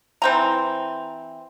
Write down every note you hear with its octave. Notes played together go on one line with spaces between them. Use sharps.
E3 C4 A#5